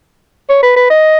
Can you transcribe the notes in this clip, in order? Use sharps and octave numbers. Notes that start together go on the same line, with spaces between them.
C#5
B4
B4
D#5